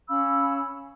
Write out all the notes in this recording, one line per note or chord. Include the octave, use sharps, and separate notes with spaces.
C#4 F5 B5 E6